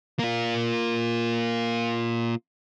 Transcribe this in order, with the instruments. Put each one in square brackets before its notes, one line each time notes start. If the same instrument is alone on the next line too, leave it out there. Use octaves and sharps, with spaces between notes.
[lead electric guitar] A#3 F4